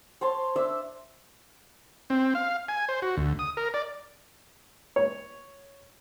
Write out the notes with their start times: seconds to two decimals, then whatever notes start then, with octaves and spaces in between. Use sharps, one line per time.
0.21 C5 C#5 A5 C6
0.56 D4 C5 E5 E6
2.10 C4
2.35 F5
2.68 G#5
2.89 C5
3.02 F#4
3.17 D2
3.39 D#6
3.57 A#4
3.74 D5
4.96 C#5